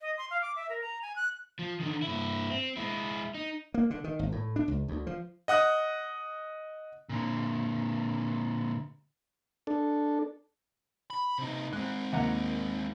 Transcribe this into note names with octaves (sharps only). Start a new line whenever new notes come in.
D#5
C6
F5
D6
E5
A#4
A#5
G#5
F#6
F3
D3 D#3
G2 E4
C4
G#3 E4
D#4
A#3
D3
D#3
G#1
A2
D4
C#2
D2
F3
D#5 F#5 D#6 F#6
A#2 D3
D4 A4
B5
C3 D#4
G#3 C4 F#6
D#2 F#5 A#5